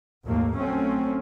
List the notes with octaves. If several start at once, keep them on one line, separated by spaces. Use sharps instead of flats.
A#1 D#2 G#2 A3 A#3
F#3 A3 C4 C#4